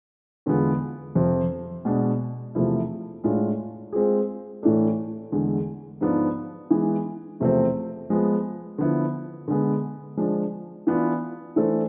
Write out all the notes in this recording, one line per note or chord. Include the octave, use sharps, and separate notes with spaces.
E2 D3 G#3 B3 F4
F2 C3 F3
B2 G#3 B3 D4
E2 C3 F3 A3 E4
A2 G#3 D4 F4
G#3 C4 F4 G#4
A2 E3 A3 D4 A4
E2 D3 G#3
G#2 F3 B3 D4 F4
E3 G#3 B3
E2 C3 F3 A3 C4
F3 G#3 B3
D3 F3 B3 E4
D3 G#3 B3
F3 G#3 D4
E3 B3 D4 F4
E3 A3 D4 A4 C5